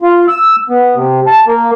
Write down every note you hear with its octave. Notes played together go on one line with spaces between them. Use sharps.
F4
E6
B3
C3
A5
A#3